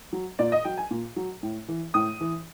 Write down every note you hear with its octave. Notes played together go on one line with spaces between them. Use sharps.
F#3
A#2 D5
D#5
F#3 G5
G#5
A#2
F#3
A2
E3
A2 D#6
E3